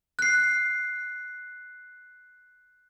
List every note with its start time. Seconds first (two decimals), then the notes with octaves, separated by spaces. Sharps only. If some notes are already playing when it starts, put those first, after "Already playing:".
0.19 F#6 C7